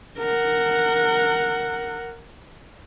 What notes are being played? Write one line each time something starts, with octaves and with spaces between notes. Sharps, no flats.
A#4 F#5